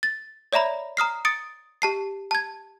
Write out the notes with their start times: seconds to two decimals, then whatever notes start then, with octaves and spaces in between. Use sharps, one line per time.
0.03 A6
0.53 C#5 D5 E5 A#5 B5
0.97 A#5 D#6 F6 C7
1.25 D#6 A6 C#7 D7
1.82 G4 A5 C7
2.31 A5 G#6